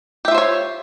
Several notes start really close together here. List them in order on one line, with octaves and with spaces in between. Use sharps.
G4 E5 F4 C5 C#5